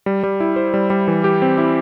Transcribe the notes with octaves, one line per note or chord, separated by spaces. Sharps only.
G3
G3
E4
C5
G3
G3
E3
G4
C4
E4